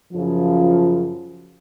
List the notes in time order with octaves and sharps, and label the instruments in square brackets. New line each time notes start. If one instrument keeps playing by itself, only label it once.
[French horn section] F#2 C#3 F3